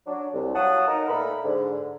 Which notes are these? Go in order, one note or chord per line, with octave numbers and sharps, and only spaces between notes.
F#3 D4
C2
F#3 F5 F#5 A5 D#6
D#4 A#4
A#2 A3 B5
G#2 D3